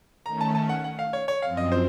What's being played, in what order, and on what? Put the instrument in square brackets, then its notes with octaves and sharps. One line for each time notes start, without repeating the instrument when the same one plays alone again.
[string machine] D#3 A3 C#4 [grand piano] A#5
[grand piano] A5
A5
F#5
F#5
F5
C#5
C#5
[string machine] F#2 F3 C4 [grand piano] F5
[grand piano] D#5
C5